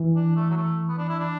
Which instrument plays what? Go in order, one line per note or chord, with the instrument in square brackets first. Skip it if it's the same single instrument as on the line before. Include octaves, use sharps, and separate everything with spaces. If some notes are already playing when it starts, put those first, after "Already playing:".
Already playing: [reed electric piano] E3
[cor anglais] D4
A3
F#3
A3
B3
D4
E4
D4